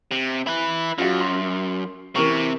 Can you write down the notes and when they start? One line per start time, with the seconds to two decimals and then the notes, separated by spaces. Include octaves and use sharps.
0.11 C3
0.47 E4 B4
0.98 F#2 F4 F#4
1.21 C6
2.16 C3 E3 A#4 C#6